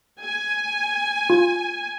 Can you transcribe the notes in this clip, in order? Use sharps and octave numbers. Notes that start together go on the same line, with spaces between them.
G#5
F4